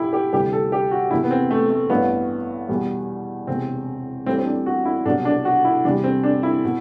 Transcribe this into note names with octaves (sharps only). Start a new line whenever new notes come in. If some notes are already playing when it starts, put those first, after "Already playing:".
Already playing: E2 B2 E4 G4
G4
D2 C3 E3 G3 G4
A4
G4
F#4
F#1 E2 C3 E4
B3
C4
A3
A3
A1 G2 E3 B3
E2 B2 G3
E1 E2 C3 C4
A1 A2 E3 G3 C4
C4
D4
F#4
E4
C2 B2 F#3 D4
D4
F#4
E4
E2 C3 G3 D4
C4
D4
E4
B2